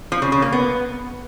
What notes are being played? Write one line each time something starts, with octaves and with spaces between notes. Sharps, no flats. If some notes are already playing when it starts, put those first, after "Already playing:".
F3
C#3
C#3
A#3
B3